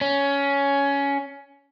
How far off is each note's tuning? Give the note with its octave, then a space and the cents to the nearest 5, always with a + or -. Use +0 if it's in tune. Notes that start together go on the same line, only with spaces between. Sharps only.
C#4 +15